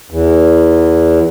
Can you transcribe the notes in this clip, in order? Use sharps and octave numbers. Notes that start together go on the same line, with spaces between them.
E2